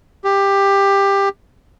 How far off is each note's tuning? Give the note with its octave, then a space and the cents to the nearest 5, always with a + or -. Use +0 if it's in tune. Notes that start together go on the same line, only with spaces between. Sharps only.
G4 +15